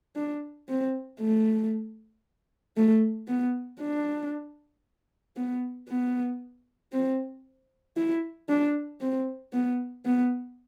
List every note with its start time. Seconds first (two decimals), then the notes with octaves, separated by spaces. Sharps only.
0.16 D4
0.69 C4
1.20 A3
2.77 A3
3.28 B3
3.80 D4
5.37 B3
5.89 B3
6.92 C4
7.97 E4
8.49 D4
9.01 C4
9.53 B3
10.05 B3